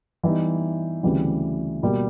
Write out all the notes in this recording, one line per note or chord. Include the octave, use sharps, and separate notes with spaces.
E3 G3 B3 D#4
D2 C#3 E3 G3 C4
B2 G3 A#3